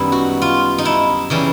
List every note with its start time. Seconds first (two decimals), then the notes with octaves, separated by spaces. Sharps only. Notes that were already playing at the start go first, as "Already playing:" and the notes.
Already playing: F#2 D#3 G3 B3 D#4 E4
0.12 F#4
0.42 F4
0.78 D#4
0.85 E4
1.30 C#3 E3 G3